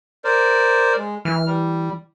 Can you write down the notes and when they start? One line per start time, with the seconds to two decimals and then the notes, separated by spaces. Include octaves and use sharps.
0.24 A#4 C5 D5
0.97 G#3
1.25 E3 F6
1.47 G3